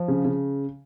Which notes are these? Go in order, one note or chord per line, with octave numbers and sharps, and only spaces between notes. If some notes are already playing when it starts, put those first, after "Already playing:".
Already playing: F3
C#3
C#3